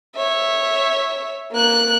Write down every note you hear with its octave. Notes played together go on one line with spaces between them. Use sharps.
C#5 E5
A#3 F#6